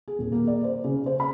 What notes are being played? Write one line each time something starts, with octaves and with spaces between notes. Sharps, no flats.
G#4
D#1
A#3
D5
C5
C#3
C5
B5